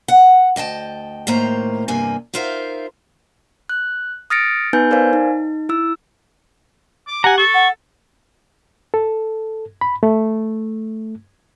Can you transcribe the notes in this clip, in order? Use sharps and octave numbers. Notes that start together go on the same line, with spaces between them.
F#5
D2 D#5 G5 A5
A2 D#3 A#3 C5 A#5
E2 G2 C3 A#3 G#5
D#4 F4 A#4 C5 E5 F5
F#6
D#6 F6 A6 A#6 C#7 D7
B3 D#4 B4 G#5 G6
A#4 C5 D5 F5 G#5
D#4
E4 E6
D6
G4 F#5 G#5 A#5
A4 C#6
F#5
A4
B5
A3